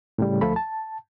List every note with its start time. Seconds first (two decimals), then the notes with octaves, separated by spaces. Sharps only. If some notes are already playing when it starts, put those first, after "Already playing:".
0.18 A2 C#3 G3
0.41 D2 F3 A3 F4 A4 B5
0.56 A5